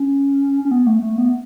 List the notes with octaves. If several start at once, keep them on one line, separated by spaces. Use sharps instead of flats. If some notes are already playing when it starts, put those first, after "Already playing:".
Already playing: C#4
C#4
B3
A3
A3
B3